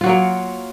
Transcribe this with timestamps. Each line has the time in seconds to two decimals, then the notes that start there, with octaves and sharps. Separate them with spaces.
0.01 F4
0.04 F#4
0.06 F#3
0.09 A#3